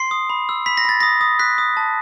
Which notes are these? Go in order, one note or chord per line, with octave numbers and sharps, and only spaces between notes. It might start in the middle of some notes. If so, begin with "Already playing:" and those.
Already playing: C6 C7
D#6
B5
E6
B5 B6
A#6
B5 A6
D#6 A#6
D#6
F#6 B6
D#6
A5